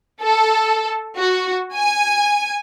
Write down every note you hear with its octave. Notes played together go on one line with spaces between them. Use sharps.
A4
F#4
G#5